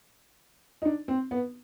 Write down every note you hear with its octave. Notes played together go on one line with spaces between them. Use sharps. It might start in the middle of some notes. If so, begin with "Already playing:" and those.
D#4
D4
C4
B3